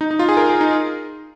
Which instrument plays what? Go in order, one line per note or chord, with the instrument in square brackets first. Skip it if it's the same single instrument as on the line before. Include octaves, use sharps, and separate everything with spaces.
[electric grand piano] D#4
D#4
F4
G#4
A#4
G#4
D#4